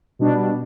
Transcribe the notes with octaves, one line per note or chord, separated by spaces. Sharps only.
B2 G3 D4